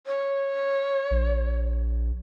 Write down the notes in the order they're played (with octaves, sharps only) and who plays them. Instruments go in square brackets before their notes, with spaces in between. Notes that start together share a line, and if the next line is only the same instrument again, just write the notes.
[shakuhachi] C#5
[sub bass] A#1